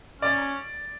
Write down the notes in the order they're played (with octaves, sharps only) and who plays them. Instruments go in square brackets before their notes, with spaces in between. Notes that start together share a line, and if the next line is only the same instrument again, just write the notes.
[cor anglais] C#4 [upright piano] D5